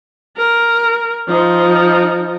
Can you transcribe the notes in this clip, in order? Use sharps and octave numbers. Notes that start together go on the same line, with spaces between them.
A#4
F3 D#4